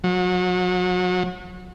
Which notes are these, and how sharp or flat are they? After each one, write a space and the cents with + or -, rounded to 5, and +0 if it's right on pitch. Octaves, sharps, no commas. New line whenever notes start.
F#3 -35